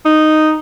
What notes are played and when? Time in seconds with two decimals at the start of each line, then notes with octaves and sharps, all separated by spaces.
0.05 D#4